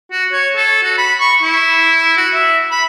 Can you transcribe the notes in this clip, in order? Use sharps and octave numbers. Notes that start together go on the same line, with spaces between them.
F#4
C#5
A4
F#4
B5
C#6
E4
F#4
E5
B5